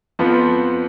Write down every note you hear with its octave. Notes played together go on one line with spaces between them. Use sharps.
F2 F3 B3